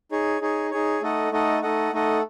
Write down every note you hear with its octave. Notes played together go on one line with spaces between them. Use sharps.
D#4 G#4 C#5
D#4 G#4 C#5
D#4 G#4 C#5
A3 D#4 A4 D#5 F#5
A3 D#4 A4 D#5 F#5
A3 D#4 A4 D#5 F#5
A3 D#4 A4 D#5 F#5